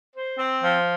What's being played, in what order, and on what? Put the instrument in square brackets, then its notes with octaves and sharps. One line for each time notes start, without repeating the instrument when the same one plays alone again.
[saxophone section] C5
C4
F3